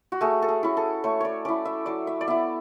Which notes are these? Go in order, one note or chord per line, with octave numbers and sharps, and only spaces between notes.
F#4
A3 G#4
A4
G#4
C#4 E4
A4
A3 C#5
C#5 D5
C#4 E4 D5
E5
F#3 D5
E5
D5
B3 E4 E5